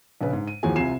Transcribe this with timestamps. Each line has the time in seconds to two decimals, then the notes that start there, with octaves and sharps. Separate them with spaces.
0.21 A#1 C#3 B4
0.33 G#2
0.47 D#7
0.63 D#2 E3 F3 F#4 G#4 G#5
0.76 C2 C3 F4 G#5 C7 E7